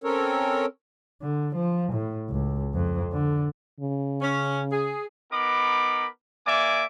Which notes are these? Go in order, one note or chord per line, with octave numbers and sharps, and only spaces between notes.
C4 C#4 A4 A#4 C#5
D3
F3
A2
C#2
F2
D3
C#3
C#4
G#4
B3 D#4 A#4 B5 D6
A#3 D5 E5 G#5 D6